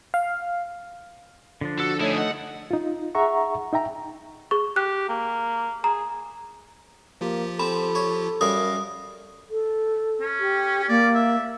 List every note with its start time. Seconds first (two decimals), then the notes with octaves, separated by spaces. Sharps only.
0.14 F5
1.61 D3 F3 D4
1.80 F#4 A4
2.01 A3 D#4 E4 G#4 C#5
2.18 D#5 F#5
2.71 D#4 F4
3.15 G#4 E5 F#5 A#5 C#6
3.73 D#4 E5 G5 A#5
4.51 G#4 C#6
4.76 G4 F#6
5.09 A#3
5.84 G#4 A#5
7.21 F3 A#3 F4 G4
7.59 C4 A4 B5
7.95 C#5
8.41 F#2 G3 A#4 F5 D#6 A#6
9.50 A4
10.21 C#4
10.39 G4
10.89 A#3 D5
11.15 E5